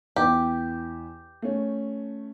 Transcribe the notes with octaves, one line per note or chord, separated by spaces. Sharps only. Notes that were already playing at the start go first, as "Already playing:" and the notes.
E2 G4
A3 C#4